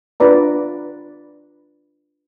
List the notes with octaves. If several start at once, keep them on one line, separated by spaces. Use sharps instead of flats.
D4 F4 B4 D5 A#5